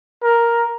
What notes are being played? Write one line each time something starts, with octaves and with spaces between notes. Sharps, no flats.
A#4